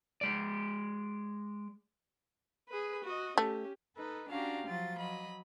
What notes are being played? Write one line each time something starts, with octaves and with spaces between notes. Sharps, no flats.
G#3 D5
G#4 B4
F#4 D#5
A3 C#4 G4
D#4 A4 B4
C#4 D4 F#4 G4 F5 A#5
F3 F#3 F4 A6
F#3 D#5 B5